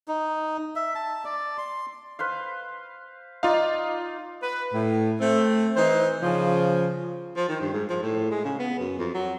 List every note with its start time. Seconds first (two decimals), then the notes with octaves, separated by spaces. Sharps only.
0.08 D#4
0.76 E5
0.95 A5
1.25 D5
1.58 C6
2.19 B4 C5 F5
3.43 D#4 F4 D5 F5
4.43 B4
4.74 A2
5.20 A3 C4
5.76 E3 D#4 C5
6.22 C#3 F3
7.36 F3
7.49 D#3
7.61 G2
7.74 G#2
7.89 F3
8.03 A2
8.31 G#3
8.45 C#3
8.59 B3
8.79 F#2
8.99 F2
9.15 F#3